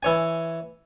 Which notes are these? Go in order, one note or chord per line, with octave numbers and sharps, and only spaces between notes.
E3 C#5 G#5